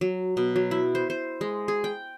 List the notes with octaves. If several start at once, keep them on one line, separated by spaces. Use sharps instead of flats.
F#3
B2
F#3
E4
C5
C5
G#3
G#4
G5